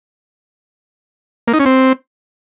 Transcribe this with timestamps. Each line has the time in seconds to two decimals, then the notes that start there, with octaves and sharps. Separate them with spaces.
1.48 A#3
1.54 D#4
1.60 C#4
1.66 C4